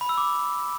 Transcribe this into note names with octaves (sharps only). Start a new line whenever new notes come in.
B5
E6
D6